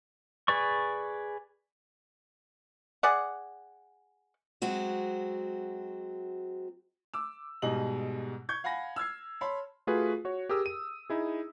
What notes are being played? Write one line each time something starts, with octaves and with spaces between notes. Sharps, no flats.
G#4 B4 D5 C#6
G#4 D5 F#5
F#3 G#3 C4 F#4
D6 E6
G#2 B2 G3 G#4 D#5 F#7
C#6 G6 G#6
F5 F#5 G#5 B5 A#6
E6 F6 G#6 C7
C#5 A5 B5 C6
A3 F4 F#4 G#4 B4
F#4 C#5
G4 G#4 A#4 D#6 E6
D#7
D#4 E4 G#4